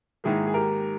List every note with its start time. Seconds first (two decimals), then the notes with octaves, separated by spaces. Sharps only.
0.24 G#2 D#3 A#3 E4 G#4
0.47 G#4
0.54 G4 A#4